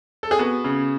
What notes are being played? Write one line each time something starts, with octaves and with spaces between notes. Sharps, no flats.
A4
G#4
B3 F#4
C#3